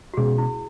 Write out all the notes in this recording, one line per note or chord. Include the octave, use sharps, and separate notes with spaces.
F#4
B2 G#3 C#4 G#4
E4